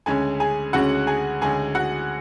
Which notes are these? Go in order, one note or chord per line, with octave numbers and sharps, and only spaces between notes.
D2 C#3 G#3 C#4 G#4 G#5
G#4 G#5
D2 C#3 G#3 C#4 F#4 F#5
G#4 G#5
D2 C#3 G#3 C#4 G#4 G#5
F#4 F#5